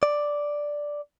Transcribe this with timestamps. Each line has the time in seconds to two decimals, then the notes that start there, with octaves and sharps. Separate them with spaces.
0.03 D5